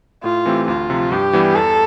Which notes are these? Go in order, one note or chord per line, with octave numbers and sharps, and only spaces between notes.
A2 F4
E3 A3 C4 G4
D2 F4
C3 F3
G2 G4
E3 G3 B3 E4
E2 A4